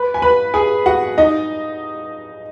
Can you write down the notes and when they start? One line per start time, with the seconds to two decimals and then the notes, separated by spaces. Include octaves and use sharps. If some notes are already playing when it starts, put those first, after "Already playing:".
Already playing: B4 B5
0.14 G#5
0.22 B4 B5
0.54 G#4 G#5
0.86 F#4 F#5
1.18 D#4 D#5